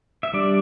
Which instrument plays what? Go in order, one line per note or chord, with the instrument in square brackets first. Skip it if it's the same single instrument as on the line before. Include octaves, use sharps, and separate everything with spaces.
[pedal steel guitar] E5
G3 D4 D5